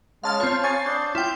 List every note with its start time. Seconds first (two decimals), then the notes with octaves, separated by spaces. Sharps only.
0.24 G#3 C#4 F5 A5 F6
0.40 C4 F4 B4 C#5
0.64 G#5 C#6 A6 C7
0.86 D4 D#5 G6
1.15 E4 F4 G5